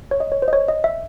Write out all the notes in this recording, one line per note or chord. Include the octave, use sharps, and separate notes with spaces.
C#5
D#5
C#5
C5
D#5
C#5
D#5
E5